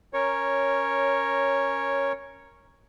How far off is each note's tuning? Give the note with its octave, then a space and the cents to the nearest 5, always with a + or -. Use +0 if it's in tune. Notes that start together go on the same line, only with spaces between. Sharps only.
C#4 +0 A#4 +0 C#5 -5